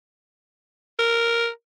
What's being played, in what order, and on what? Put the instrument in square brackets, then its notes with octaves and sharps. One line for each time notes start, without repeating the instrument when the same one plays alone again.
[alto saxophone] A#4